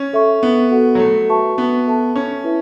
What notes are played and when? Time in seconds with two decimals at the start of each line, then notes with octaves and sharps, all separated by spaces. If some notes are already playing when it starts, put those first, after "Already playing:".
Already playing: C#4
0.13 A4 E5 C#6
0.43 B3
0.71 F#4 A4 F#5
0.95 F#3
0.99 A3
1.29 F#4 B4 E5 A5 C#6
1.58 B3
1.87 A4 E5 A5
2.16 C#4
2.44 E4 B4 E5